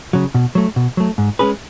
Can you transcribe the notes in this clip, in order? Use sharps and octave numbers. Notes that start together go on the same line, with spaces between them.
C#3 F#3
B2
F#3 A3
B2
F#3 A3
G#2
G#3 C#4 G#4 B4